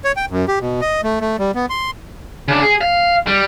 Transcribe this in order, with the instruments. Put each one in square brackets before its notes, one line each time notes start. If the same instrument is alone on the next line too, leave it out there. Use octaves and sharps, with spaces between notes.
[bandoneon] C#5
G5
F#2
G4
B2
D#5
A3
A3
G3
B3
C6
[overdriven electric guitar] C#3 D4
G#4
F5
G3